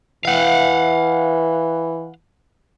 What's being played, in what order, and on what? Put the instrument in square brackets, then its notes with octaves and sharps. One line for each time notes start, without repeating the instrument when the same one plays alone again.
[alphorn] E3 [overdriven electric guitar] F5 F#5